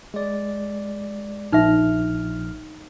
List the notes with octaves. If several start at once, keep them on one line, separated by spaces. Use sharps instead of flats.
G#3 D5
A#1 D#4 E5 F6